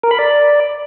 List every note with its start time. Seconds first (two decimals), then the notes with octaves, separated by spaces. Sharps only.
0.03 A#4
0.11 B5
0.19 D5